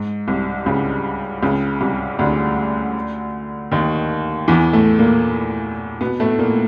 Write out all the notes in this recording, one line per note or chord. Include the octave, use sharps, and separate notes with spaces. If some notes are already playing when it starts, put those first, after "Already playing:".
Already playing: G#2
C2 C3
C#2 C#3
C#2 C#3
C2 C3
D2 D3
D#2 D#3
E2 E3
A2 A3
A#2 A#3
B2 B3
A2 A3
A#2 A#3